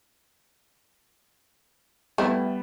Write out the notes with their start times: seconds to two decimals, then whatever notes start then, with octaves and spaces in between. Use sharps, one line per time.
2.18 G3 A3 B3 E4